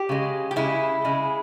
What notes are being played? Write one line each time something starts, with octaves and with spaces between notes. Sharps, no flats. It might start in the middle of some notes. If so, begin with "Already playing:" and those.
Already playing: G4
C#3 G#3
G4
C#3 G#3 E4
C#3 G#3